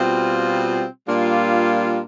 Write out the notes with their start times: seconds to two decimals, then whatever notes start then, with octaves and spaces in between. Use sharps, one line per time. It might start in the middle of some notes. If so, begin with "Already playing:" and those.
Already playing: B2 G3 C4 F4
1.08 A#2 G3 A#3 D4 F4